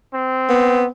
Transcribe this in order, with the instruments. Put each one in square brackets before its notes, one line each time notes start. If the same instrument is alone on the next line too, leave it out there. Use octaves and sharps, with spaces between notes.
[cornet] C4
[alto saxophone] B3